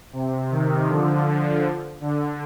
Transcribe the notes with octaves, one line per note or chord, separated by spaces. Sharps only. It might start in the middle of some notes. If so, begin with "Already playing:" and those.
C3
C3 D#3
D3 F3
D3